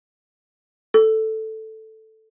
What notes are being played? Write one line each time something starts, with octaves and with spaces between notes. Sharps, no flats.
A4